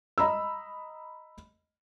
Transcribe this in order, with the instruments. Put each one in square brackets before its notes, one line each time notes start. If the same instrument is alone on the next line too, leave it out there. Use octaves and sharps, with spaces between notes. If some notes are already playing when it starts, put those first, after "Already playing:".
[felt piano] D#5 A#5 B5 E6